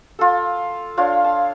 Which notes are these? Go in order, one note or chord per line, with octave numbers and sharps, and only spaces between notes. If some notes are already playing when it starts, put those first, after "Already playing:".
F4 A4
D4 F4 C#5 F5
A5